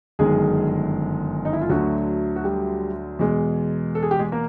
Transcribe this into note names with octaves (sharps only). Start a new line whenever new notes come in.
G1 F#2 D#3 G#3 G#4
D#4
E4
F4
D2 D3 F#3 A3 F#4
F#4
G3 G4
E2 B2 G#3
A4
G#4
G4
G#3 G#4
A#3 A#4